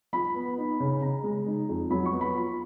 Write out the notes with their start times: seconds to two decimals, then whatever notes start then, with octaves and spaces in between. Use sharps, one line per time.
0.13 F3 B5
0.35 B3
0.58 D#4
0.80 C#3
1.02 C#3 A#5
1.23 G#3
1.46 D#4
1.69 F2
1.90 F#3 B5
2.06 C#6
2.12 B3
2.21 B5
2.35 F4